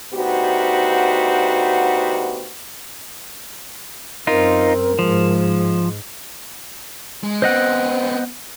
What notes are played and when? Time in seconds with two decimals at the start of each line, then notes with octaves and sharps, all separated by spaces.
0.14 D2 B3 D#4 F#4 G4 C5
4.27 F#2 C4 D#4 F4 A#4
4.99 G#2 F3 G#3
7.24 G#3
7.42 B3 C4 C5 D#5 F#5